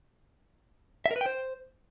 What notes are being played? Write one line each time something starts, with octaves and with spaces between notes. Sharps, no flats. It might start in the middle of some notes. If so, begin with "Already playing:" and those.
E5
A#4
B4
G5
C5